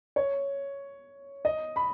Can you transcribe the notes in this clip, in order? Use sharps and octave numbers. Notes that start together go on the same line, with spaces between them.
C#5
D#5
B5